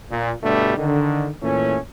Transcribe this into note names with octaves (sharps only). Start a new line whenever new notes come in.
A#2
G2 B2 D3 G3 A3
D3 D#3
A#2 E3 A3 C#4